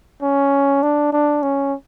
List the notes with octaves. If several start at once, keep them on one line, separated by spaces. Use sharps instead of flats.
C#4
D4
D4
C#4